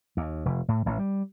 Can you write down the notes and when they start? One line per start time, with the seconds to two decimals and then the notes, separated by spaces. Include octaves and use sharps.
0.17 D#2
0.45 F1
0.68 A2
0.86 A1
0.99 G3